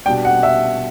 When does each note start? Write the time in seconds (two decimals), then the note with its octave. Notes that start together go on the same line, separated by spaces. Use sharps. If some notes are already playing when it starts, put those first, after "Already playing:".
0.06 B2 G3 D4 G5
0.25 F#5
0.43 E5